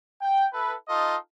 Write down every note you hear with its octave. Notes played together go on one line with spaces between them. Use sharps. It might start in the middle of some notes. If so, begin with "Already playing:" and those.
G5
E4 A4 B4
D#4 F4 A4 D#5